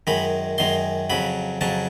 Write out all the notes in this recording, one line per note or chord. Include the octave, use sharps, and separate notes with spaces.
F#2 D#3 G#3 B5
F#2 D#3 G#3 C6
F2 C#3 F#3 B5
F2 C#3 F#3 A5